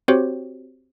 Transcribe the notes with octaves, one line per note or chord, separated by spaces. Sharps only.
C4 F#4 G4 C5 C#5